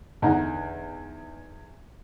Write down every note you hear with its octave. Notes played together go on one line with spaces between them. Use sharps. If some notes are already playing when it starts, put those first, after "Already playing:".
E2 D3 D#4 F#5 A#5